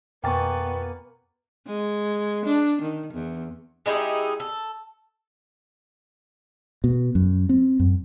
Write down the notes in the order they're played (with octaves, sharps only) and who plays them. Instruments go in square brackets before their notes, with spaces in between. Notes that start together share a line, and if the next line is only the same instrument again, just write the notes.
[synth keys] F2 B2 A6 [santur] A#3 G#5 [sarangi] B3 [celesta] G5 C#6
[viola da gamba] G#3
D4
D#3
E2
[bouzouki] G#3 D#4 E4 G4
A4
[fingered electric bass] B2
F#2
C4
F#2